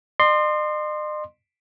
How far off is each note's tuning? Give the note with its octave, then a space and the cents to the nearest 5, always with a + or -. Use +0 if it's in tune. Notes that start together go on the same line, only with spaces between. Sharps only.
D#5 -45 C6 +0